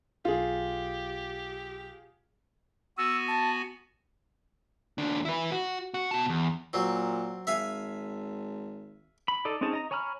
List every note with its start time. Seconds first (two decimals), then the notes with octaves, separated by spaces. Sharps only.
0.25 B1 F4 G4 G#4
2.98 B3 F#4 G#5 E6
3.28 A5
4.98 D#2 D4
5.25 E4 B4
5.52 F#4
5.94 F#4
6.11 B2 A5
6.29 E2
6.73 A#2 F#3 C4
7.47 G#1 E5 F5 G#5
9.28 B5
9.45 D#4 A4 D5
9.61 C4 C#4 D#4 G#4 A5
9.73 D#5 A#5
9.91 C#5 G#5 A#5 B5 F6